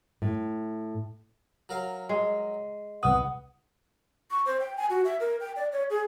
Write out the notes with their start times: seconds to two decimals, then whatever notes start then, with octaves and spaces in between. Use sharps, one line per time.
0.22 A2
1.69 F#3 A#4 F5
2.09 G#3
3.03 C2 B3 F#5 D#6
4.31 C#6
4.46 C5
4.60 G5
4.77 G#5
4.90 F#4
5.05 E5
5.20 A#4
5.40 G5
5.56 D5
5.72 C#5
5.90 G#4